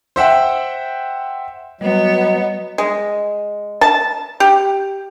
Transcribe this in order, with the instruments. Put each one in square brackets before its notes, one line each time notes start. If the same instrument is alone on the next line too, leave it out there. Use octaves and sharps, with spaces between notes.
[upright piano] C5 E5 F#5 G5
[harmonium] F#3 [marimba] G3 [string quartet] B3 [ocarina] D#5
[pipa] G#3
A5
G4